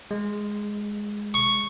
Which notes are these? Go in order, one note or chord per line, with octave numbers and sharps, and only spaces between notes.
G#3
C#6